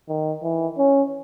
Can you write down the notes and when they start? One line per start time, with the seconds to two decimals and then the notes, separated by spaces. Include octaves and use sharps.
0.08 D#3
0.42 E3
0.78 C#4